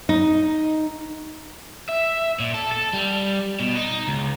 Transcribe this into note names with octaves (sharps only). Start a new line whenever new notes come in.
D#4
E5
A#2
A4
A4
G3
B2
D#4
C#2